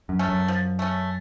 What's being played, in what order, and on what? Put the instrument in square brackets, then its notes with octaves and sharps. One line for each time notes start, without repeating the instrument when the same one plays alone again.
[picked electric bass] F#2
[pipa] A3 C#4
[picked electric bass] F#2
[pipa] F3
A3 C#4